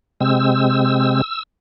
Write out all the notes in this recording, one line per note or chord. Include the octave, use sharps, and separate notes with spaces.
C3 G#3 C4 E6